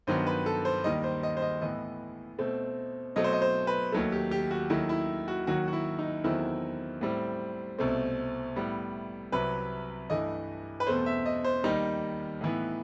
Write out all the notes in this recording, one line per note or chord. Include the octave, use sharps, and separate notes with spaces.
G2 D#3 F#3 B3 C5
B4
A4
C5
D#2 D#3 G3 D#5
C5
D#5
C5
D#5
A2 E3 B3 D#5
B2 A3 C4
B2 F#3 A3 C4 D#5
C5
D#5
C5
B4
D#2 D#3 F#3 A3
G4
G4
F#4
D#2 D#3 F#3 A3 E4
E4
F#4
D#2 D#3 F#3 F#4
F#4
E4
D#4
E2 D#3 F#3 A3 C4 E4
A2 G3 C4
C2 B2 A3 C4
A2 G3 B3
C2 C3 F#3 B4
G2 E3 A3 D#5
B4
E2 B2 A3 C4 C5
E5
D#5
C5
D#2 D#3 G3 D#4
A2 E3 B3